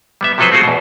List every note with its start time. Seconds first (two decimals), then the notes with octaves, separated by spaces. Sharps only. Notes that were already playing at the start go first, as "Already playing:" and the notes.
0.21 G3 B3 E5
0.38 C3 F3 F#3 A4 B4 C5
0.52 A3 C4 F4 F#4 G#4
0.63 E2 B2